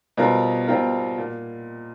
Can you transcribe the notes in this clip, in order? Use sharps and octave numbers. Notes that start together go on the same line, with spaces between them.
B2 G3 C4 F4 A#4
B2 G3 C4 F4 A#4
A#2